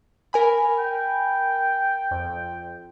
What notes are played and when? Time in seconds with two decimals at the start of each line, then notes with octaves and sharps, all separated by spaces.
0.33 A#4 G#5 B5
0.78 G5
2.11 F2